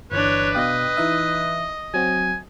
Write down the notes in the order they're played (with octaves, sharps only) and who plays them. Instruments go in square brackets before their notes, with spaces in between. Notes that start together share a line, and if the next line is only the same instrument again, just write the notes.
[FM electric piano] G1 E3 [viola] D4 C#5 [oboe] B4
[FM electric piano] B2 F5 G5 [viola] D#5
[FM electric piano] E3 D#4 E5
[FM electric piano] F#3 C4 F#4 [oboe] G#5